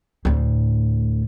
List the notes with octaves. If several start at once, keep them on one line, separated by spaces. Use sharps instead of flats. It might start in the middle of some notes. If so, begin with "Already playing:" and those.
D2 A2